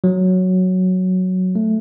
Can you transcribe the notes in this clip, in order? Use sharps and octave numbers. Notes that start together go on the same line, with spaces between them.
F#3
A3